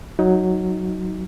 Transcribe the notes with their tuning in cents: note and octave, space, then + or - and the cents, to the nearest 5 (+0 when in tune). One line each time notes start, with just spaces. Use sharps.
F#3 +0 D#4 +15